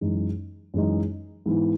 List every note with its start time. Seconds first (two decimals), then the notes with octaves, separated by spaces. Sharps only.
0.01 F#2 E3 G#3 D#4
0.74 F#2 E3 G#3 D#4
1.46 G#2 E3 B3 E4